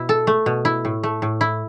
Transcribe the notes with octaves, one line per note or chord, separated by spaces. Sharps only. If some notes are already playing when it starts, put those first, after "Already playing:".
Already playing: B2 E4
A4
A3
B2
E4
A2
A3
A2
E4